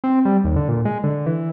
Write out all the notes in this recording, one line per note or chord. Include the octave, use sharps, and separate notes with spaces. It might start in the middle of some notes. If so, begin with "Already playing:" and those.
C4
G3
D#2
D3
A#2
G#3
D3
E3